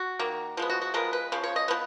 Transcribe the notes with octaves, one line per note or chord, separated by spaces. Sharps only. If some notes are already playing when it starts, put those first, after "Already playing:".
Already playing: F#4
D#3 A#3
F3 G#3 B3
F#4
F#4
F3 G#3 B3 A#4
B4
C#3 F3
C#5
D#5
F3 B3